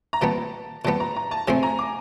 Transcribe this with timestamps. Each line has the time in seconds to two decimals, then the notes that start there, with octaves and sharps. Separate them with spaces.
0.13 A#5
0.21 A#2 G3 B3 A5
0.85 A#2 G3 B3 A5
1.00 A#5
1.16 A#5
1.31 A5
1.47 C3 F3 A3 C4 G#5
1.63 A#5
1.79 D6